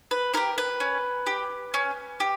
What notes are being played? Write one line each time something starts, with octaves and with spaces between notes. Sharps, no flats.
B4
E4 G4 A#4
B4
C#4
G4
C#4
G4